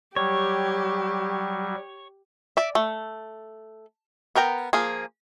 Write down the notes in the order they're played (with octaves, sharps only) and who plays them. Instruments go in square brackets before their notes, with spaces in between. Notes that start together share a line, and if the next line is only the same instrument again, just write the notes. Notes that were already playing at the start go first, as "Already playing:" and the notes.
[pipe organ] F#3 G3 [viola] G4 [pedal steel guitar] C#5
[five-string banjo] D5 E5
A3
B3 A#4 G5 A#5
F3 A#3 G#4